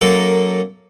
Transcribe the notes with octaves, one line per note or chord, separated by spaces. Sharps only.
F#2 A#3 A4